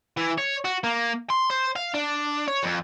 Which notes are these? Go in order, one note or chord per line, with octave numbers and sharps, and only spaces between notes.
E3
C#5
F#4
A#3
C6
C5
F5
D4
C#5
F2